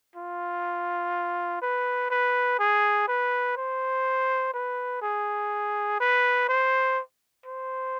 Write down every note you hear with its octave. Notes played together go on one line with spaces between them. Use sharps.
F4
B4
B4
G#4
B4
C5
B4
G#4
B4
C5
C5